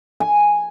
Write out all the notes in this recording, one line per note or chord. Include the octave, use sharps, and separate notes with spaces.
G#5